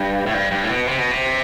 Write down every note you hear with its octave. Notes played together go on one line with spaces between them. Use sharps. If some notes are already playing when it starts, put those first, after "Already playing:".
Already playing: G2
A2
G2
G2
A2
B2
C3
B2
C3